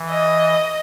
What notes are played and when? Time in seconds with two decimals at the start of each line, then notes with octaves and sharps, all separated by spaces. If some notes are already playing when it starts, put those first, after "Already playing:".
Already playing: E3
0.10 D#5